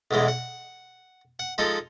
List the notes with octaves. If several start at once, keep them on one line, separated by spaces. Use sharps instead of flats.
B1 E2 G#2 E3 G#3
F#5
F#5
F3 G#3 D#4 A4